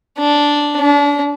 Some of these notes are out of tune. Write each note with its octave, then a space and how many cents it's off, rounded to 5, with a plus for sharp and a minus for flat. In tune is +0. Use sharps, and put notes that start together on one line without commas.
D4 -5
D4 -35